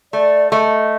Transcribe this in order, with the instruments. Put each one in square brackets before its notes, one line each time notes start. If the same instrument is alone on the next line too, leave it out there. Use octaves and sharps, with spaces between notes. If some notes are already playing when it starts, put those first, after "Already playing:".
[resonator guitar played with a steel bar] A3 [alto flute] D5
[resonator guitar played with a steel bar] A3 [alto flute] D#5